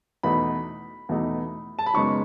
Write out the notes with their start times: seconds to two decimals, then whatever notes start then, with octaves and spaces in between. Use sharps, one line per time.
0.23 E2 B2 A3 D#4 B5
1.09 E2 B2 A3 D#4
1.79 A5
1.86 B5
1.94 F#2 C#3 G#3 B3 D#4 C#6